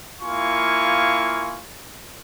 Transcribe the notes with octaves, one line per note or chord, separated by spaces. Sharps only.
A#3 E4 F4 G#5 C#6